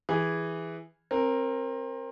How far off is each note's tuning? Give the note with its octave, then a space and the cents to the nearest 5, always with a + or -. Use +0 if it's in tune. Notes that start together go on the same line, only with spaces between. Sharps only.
E3 +0 G#4 -10
C4 +25 A#4 +0